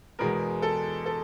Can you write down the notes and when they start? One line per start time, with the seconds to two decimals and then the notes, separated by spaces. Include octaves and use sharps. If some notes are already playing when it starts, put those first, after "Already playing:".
0.19 E2 B2 G#3 B3 A#4
0.62 A4
1.06 A4